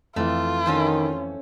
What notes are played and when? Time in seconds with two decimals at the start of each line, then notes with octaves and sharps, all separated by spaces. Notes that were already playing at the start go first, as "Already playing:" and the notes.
0.16 F2 E3 A3 F4
0.66 D#3 C#4 A4 C5